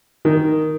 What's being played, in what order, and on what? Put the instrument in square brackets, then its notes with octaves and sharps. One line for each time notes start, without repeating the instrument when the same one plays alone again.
[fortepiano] D#3